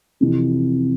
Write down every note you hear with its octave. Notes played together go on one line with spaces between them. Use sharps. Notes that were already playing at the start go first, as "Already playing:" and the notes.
F2 C3 E3